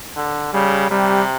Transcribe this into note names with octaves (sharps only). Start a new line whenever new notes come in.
D3
C#3 G3
C3 G3